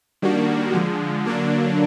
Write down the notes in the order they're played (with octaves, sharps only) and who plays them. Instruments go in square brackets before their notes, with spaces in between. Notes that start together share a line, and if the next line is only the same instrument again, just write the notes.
[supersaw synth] D#3 G3 A#3 D4 F#4
D3 F3 G#3
D3 F#3 A#3 D4